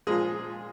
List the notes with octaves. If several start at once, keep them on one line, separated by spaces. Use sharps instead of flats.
A#2 F3 G#3 G#4